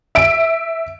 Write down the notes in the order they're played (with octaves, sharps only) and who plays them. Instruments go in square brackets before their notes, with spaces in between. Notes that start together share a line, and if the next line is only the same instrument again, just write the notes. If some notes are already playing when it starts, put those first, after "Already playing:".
[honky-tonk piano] E5 D7